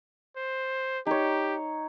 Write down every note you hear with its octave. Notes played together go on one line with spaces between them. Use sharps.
C5
D#4 G4 C#5